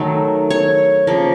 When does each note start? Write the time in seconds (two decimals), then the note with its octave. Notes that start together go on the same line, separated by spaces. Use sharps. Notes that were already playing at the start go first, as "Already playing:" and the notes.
Already playing: D#3 F#3 A3
0.50 C#5
1.07 C#3 F3 A#3